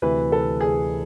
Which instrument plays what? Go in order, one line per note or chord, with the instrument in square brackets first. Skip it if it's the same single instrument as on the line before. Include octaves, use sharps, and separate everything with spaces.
[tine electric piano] D2 C3 E3 [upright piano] B4
[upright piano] A4
G#4